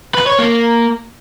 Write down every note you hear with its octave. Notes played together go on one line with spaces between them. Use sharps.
B4
C#5
A#3